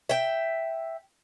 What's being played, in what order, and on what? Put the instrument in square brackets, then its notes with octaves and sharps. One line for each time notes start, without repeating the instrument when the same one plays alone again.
[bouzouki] E5 G5